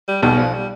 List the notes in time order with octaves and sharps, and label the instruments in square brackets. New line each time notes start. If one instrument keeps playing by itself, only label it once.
[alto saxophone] G3
[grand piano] B1 B2 [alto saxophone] G3
[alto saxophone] F3
G3